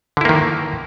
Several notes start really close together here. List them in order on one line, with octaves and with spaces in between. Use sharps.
D3 E4 A#3 D#3